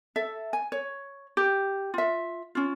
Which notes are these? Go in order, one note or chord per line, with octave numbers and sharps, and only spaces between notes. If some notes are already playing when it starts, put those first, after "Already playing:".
A4 E5
G#5
C#5
G4
F4 E5
C#4 F4